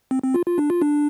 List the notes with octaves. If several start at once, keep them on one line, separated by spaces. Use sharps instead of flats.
C4
C4
F4
F4
D4
F4
D4